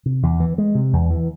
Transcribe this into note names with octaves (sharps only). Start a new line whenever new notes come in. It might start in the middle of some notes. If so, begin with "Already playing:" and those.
C3
E2
E3
G#3
C3
E2
E3